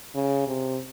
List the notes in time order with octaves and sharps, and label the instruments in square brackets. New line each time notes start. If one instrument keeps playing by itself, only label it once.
[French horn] C#3
C3